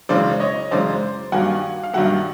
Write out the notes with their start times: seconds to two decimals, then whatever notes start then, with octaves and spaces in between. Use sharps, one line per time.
0.09 F#2 C#3 E3 G#3 C5 D5
0.40 C#5 D#5
0.71 F#2 C#3 E3 G#3 C5 D5
1.32 G2 D#3 F#3 A#3 F#5 G#5
1.83 F5
1.93 G2 D#3 F#3 A#3 E5 F#5